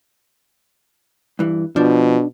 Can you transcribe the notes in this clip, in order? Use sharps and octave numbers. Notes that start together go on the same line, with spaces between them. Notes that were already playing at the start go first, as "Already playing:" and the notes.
G2 E3
B2 F3 D4